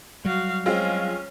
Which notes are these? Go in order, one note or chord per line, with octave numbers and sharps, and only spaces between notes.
F#3 G3 F#4 F5
G#3 C4 C#4 F4